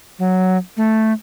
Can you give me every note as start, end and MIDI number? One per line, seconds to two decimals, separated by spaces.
0.19 0.57 54
0.77 1.13 57